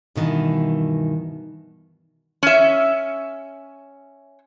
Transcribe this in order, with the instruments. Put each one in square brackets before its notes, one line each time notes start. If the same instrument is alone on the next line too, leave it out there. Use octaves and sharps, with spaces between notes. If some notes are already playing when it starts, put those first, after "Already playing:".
[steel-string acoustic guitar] G2 B2 D#3 E3
[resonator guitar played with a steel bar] C#4 E5